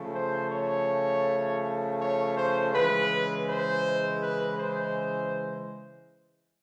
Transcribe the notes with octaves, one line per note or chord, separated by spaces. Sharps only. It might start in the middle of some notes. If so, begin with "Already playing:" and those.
Already playing: C#3 F3 A3
C5
C#5
C#5
C5
C#3 E3 G#3 B4
C5
B4
C5